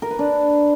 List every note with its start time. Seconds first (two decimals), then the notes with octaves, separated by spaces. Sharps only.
0.02 A#4
0.11 B4
0.19 D4